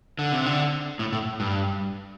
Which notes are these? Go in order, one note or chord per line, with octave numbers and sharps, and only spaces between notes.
D3
C3
D3
A2
A2
G2